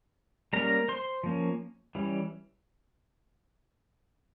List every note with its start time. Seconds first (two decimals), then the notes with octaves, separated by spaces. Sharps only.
0.53 G3 A#3 C#4 A#4 A#5
0.88 C5 C6
1.24 F3 A#3 C#4
1.95 E3 G3 C#4